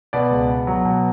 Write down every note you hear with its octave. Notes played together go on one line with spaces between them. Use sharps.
B2 B4 D5
C#2
B3
F#3
B2